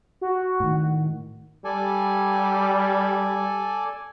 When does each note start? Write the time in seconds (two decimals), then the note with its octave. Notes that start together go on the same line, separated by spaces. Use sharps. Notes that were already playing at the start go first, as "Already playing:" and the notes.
0.21 F#4
0.60 A2 D#3
1.65 G3 A4 D5 G#5